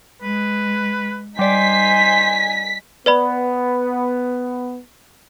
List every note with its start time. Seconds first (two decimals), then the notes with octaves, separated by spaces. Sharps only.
0.22 G#3 B4
1.39 G3 D#4 C5 D5 G#5 B6
3.06 B3 B4 D5 B5